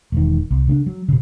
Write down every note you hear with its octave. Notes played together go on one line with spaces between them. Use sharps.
E1 D#3
C2
C#3 C4 D4
F#3
A#2 C#3